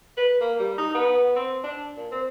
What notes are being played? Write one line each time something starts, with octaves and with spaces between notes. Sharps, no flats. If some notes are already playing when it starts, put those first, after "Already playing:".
B4
A#3
G3
D#4
B3
C4
D4
A#2
C4